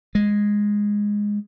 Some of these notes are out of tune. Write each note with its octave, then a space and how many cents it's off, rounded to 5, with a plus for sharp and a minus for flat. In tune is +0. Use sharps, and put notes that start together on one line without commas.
G#3 -10